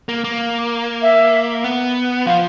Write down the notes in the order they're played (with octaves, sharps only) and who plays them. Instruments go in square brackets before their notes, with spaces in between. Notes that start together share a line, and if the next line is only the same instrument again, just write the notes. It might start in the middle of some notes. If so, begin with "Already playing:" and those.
[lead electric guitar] A#3
A#3
[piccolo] E5
[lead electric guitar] B3
[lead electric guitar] F3 [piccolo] F5